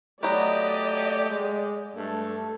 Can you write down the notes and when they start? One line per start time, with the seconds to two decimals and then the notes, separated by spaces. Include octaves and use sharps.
0.23 F#3 A3 B3 F#4 G4 D5 D#5
1.30 G#3
1.96 G2 A3 A4